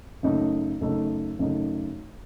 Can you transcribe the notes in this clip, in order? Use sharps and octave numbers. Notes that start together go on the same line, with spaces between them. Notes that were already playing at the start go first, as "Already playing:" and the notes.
F#2 C#3 A3 D#4
F#2 C#3 A3 D#4
F#2 C#3 A3 D#4